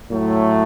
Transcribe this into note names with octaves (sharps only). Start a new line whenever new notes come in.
A2 F#3 A3